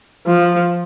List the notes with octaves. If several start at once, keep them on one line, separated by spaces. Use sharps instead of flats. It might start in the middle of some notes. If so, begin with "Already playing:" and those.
F3